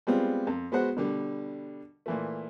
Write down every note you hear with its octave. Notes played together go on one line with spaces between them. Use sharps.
G3 G#3 B3 C4 F4
F2
G#3 B3 F#4 C5 F#5
B2 D3 G3
A#2 E3 A3